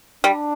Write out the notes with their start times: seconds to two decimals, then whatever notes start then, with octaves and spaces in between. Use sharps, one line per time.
0.24 G3 D4